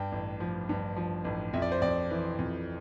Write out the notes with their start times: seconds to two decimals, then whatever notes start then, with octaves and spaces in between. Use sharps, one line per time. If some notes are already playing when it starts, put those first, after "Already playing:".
Already playing: G2 G5
0.12 A1
0.40 F3
0.69 G2
0.96 F3
1.25 A1
1.53 F2 E5
1.62 D5
1.72 C5
1.82 F2 D5
2.10 E3
2.39 F2